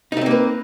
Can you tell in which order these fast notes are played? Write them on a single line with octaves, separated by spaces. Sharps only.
D#4 A3 C4 A#3 B4